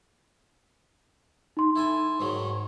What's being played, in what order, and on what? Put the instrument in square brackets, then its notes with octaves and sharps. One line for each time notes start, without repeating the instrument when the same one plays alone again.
[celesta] D#4 C6
[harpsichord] E4 A4 G#5
G#2 D#3 F#3